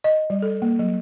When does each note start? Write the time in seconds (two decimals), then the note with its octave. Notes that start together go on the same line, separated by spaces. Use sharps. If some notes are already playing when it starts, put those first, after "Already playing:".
0.04 D#5
0.30 G3
0.42 A4
0.62 A#3
0.79 F#3